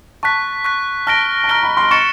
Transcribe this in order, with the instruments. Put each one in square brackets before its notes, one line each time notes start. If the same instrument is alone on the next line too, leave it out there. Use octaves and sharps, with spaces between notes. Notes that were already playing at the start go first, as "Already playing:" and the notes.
[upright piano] A5 [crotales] C#6 F#6 B6
[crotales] C#6 F#6 B6
[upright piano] A5 [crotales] F6 A#6 D7 G7
[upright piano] A5
[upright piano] A#5 [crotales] F6 A#6 D7 G7
[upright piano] B5
C6
[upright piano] C#6 [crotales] A6 C#7 E7 G7